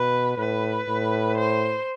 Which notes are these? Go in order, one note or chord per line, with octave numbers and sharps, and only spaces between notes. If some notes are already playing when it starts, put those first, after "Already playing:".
Already playing: B2 B4
A2 B4
A2
C5